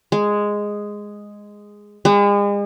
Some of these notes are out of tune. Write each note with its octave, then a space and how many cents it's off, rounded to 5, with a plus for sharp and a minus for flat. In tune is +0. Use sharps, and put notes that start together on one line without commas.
G#3 -5
G#3 -40